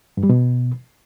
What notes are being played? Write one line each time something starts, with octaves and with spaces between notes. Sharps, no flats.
G2
G3
B2